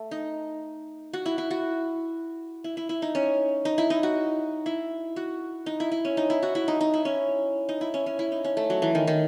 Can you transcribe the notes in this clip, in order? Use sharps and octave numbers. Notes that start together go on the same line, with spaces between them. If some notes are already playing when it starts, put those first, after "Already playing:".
Already playing: A3
D#4
F#4
E4
E4
F#4
E4
E4
E4
D#4
C#4
D#4
E4
D#4
F#4
E4
F#4
D#4
E4
E4
C#4
D#4
E4
F#4
E4
D#4
D#4
E4
C#4
D#4
E4
C#4
C#4
E4
D#4
C#4
A3
F#3
E3
D#3
D#3